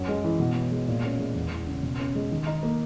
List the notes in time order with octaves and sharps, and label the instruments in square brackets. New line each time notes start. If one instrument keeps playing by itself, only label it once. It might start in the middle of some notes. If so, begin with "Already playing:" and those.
Already playing: [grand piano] F#2
G#3
E3
B2
B3
G#3
A#2
C#4
G#3
E2
E3
C#3
B2
C#4
G#3
D#3
D#4
A#3